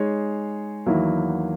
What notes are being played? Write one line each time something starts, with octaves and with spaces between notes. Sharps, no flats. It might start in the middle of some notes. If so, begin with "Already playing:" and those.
Already playing: G#3 D#4 G#4 C#5
E2 D#3 F#3 A#3 E4